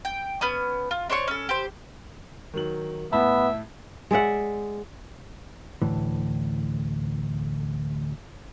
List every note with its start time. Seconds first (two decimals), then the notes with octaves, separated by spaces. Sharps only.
0.05 G5
0.41 B3 C#4 D#6
0.91 F4
1.10 D4 C5 C#5 C#6
1.28 C#4 A4
1.49 G4 C5
2.54 D#3 F#3 F#7
3.13 A2 B3 E5 A5 B5
4.11 G#3 D5 E5 F#5
5.82 D2 A2 E3